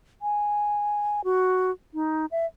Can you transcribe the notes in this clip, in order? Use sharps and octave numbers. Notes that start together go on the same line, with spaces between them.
G#5
F#4
D#4
E5